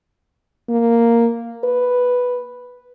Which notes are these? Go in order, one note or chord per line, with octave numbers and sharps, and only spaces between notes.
A#3
B4